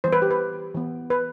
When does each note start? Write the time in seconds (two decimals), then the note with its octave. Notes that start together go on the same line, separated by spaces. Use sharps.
0.04 E3 G3 B3 C5
0.13 B4
0.22 G4
0.31 B4
0.75 E3 B3
1.10 B4